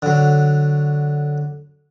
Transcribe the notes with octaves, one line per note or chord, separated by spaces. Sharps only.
D3 F#3